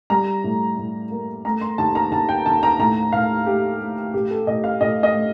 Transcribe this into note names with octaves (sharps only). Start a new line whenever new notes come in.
G3 A#5
A2
A2
A#3
A3 A#5
C6
D#2 A5
A#5
D#2 A5
G5
D#2 A5
A#5
A2 A#5
A2 F5
A3 G4
A3
A2 G4
A4
A2 D#5
F5
A2 D#5
D#5
A3